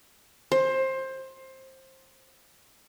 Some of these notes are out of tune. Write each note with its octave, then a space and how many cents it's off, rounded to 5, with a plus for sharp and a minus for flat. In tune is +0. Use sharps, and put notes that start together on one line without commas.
C5 +20